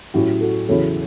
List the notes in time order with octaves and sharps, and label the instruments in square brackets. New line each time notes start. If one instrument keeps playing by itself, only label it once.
[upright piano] A2 F#3 C#4 E4 G4
F#4 A4
E2 C#3 F#3 C#4 E4 A4 C#5